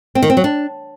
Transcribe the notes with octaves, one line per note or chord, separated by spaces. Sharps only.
C4
D#3
C4
F#3
D4